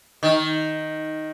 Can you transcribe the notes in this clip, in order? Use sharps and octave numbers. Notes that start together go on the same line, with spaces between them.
D#3